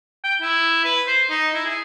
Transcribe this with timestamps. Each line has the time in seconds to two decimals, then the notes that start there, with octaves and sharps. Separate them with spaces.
0.24 G5
0.41 E4
0.85 B4
1.07 C5
1.30 D#4
1.54 E4
1.66 G#4